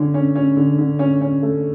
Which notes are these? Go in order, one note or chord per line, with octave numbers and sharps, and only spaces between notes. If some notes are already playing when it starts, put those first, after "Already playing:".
Already playing: D3 C#4
C#4
C#4
D3
D3
C#4
C#4
A3